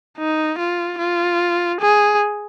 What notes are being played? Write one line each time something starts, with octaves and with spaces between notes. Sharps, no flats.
D#4
F4
F4
G#4